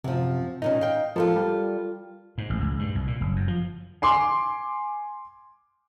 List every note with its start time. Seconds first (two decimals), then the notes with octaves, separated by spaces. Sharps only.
0.04 F#2 C3 F3
0.62 A#2 D#3 C#4 D#4
0.81 F5 G5
1.16 F3 F4 A4 A#4
1.36 G3
2.38 G#2
2.50 A1
2.61 C#2
2.79 G2
2.95 C2
3.07 A#2
3.21 F#1
3.36 F#2
3.48 F3
4.02 G#5 C6 D6